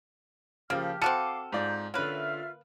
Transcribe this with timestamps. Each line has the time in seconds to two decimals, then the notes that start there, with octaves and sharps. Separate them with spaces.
0.70 C#3 F3 A#3 G4 A5 F6
1.02 C4 F#4 A4 F5 D6 F6 C#7 D#7
1.53 G#2 F4 D5 A#5 G6
1.94 D3 A#3 C#4 F4 B4 E5 F6